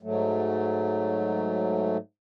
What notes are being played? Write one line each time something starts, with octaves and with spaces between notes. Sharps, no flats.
G#2 F#3 A3